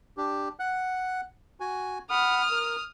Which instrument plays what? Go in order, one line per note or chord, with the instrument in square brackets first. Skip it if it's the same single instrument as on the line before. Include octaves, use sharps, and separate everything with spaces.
[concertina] D4 G4
F#5 F#6
F#4 G#5
[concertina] F#5 B5 [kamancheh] D#6 F6
[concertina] A#4